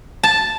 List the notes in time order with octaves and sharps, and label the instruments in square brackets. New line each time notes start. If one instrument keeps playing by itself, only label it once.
[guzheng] A5